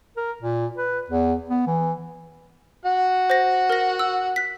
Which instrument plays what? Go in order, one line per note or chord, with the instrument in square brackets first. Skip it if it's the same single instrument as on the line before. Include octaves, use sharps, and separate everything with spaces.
[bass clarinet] A#4
A#2
B4
E2
B3
E3
[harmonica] F#4 F#5
[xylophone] C5 A#6
A#4 A#6
E6
F#6 B6